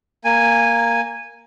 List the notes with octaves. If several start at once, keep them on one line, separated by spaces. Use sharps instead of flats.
A#3 G#5